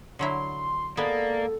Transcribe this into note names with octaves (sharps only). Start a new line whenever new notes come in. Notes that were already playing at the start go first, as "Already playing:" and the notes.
D3 F#3 E4 C6
G#3 A#3 B3 A4 D5